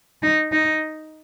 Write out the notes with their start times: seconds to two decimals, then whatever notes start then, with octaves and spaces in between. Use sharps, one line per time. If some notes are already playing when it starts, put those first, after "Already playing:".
0.23 D#4
0.52 D#4